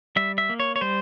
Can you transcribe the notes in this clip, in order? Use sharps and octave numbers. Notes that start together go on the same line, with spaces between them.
G3 E5
E5
A#3
C#5
C#5
G3 C5